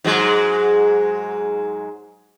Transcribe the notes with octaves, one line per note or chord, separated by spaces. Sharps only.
G#2 F#3 G#3